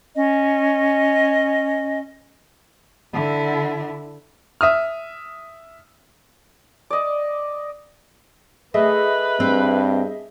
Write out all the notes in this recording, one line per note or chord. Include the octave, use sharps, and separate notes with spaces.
C#4 D#5
D3 E4
E5 D#6 F6
D5 D#5
A3 G#4 B4 D#5 E5
G2 C4